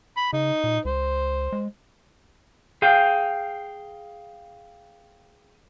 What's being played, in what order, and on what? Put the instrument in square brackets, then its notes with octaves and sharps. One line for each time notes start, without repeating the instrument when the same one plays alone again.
[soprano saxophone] B5
[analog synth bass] C#3 [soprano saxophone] D#4
[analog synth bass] A#2
[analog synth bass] C#2 [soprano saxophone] C5
[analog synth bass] G#3
[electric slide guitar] G#4 F5 G5